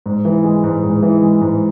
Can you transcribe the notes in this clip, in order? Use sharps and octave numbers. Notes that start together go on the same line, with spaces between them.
G#2
E3
G#3
G#2
G#2
E3
G#3
G#2